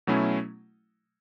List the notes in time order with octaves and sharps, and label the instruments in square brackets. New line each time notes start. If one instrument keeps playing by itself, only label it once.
[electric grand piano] B2 F#3 A3 C#4 E4